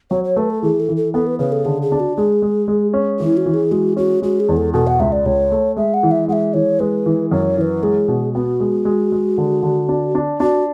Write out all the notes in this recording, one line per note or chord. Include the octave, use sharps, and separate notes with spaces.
F#3 C#5
C#5
A3 B4
A4
E3 G#4
A4
E3
A4
B3 A4
B4
C#3 B4
A4
D3 G#4
G#4
D4
F#4
G#3 G#4
G#3
G#3
C#4
E3 E4
F#4
E3
G#4
G#3 F#4
C#4 F#4
G#3 F#4
G#4
E2
A4
B2 A4
F#5
C#2 E5
D5
C#2 C#5
A3
G#3 E5
F#5
E3
E5
G#3 E5 F#5
E3 C#5
G#3 B4
E3
F#2 C#5
E3 B4 C#5
G#3 G#4
B2
B3 F#4
G#3
G#3
G#3
D3
D3
D4
D4
D4 F#4